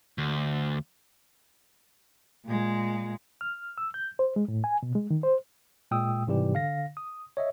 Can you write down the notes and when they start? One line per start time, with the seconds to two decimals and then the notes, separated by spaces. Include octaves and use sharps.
0.18 D2
2.46 A#2 G#3
3.41 F6
3.78 E6
3.94 G6
4.19 C5
4.36 G#3
4.48 A2
4.64 G#5
4.83 B2
4.95 G#3
5.11 D#3
5.23 C5
5.91 A#2 G#3 G5 D#6 E6
6.27 G#2 C3 E3 G3 G4
6.54 D3 F5 A#6
6.97 D#6
7.37 C#5 D#5 E5